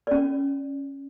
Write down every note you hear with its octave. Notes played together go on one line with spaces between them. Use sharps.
C#4 D5